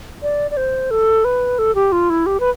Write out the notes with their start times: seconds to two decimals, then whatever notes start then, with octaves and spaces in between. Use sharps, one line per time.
0.22 D5
0.51 D5
0.57 C5
0.91 A4
1.25 B4
1.59 A4
1.75 G4
1.92 F4
2.10 E4
2.26 G4
2.40 B4